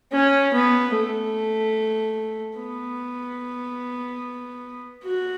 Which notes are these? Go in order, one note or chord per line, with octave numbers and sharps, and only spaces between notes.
C#4
B3
A3
B3
F#4